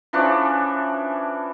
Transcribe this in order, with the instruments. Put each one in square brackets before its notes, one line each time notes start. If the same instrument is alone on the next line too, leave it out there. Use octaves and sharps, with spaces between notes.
[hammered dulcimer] E3 F3 C#4 D4